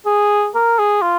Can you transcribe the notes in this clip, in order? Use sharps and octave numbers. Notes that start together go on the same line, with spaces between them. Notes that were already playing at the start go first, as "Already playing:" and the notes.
G#4
A#4
G#4
F4